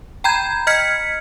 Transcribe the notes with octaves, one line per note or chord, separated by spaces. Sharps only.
G5 A#5 B5 G6 G#6
D#5 F6 G#6 B6 C#7